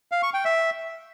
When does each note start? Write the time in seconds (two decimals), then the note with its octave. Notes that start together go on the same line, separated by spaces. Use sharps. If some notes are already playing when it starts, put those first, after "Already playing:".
0.12 F5
0.23 C#6
0.34 G5
0.45 E5